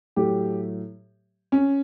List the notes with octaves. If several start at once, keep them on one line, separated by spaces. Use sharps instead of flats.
A2 F#3 A3 G4
C#4